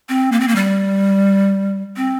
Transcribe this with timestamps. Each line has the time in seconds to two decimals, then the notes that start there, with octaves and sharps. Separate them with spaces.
0.09 C4
0.32 A#3
0.40 C4
0.48 A#3
0.56 G3
1.96 C4